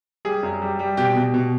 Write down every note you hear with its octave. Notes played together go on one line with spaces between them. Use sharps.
G3 G#4
F#2
G3
G3
B2 G4
B2
B2